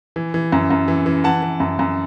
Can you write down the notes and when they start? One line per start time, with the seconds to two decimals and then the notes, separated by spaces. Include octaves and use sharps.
0.16 E3
0.34 E3
0.52 F#2
0.70 F#2
0.88 E3
1.06 E3
1.24 E3 F#5 A5
1.42 E3
1.60 F#2
1.79 F#2